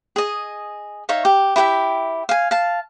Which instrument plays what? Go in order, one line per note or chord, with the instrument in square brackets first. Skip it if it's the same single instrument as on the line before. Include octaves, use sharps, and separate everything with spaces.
[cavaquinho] G#4 D#5
D#4 C#5 E5 F5
G4
E4 G4 E5 G5
F5 G#5
F5 A5